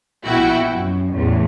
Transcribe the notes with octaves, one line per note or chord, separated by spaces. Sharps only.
A#1 B2 E4 F#4 G5
F#2
A1 E2 A2